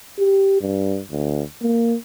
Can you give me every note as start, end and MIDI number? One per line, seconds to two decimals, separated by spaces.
0.18 0.56 67
0.61 1.00 43
1.11 1.42 38
1.62 1.96 58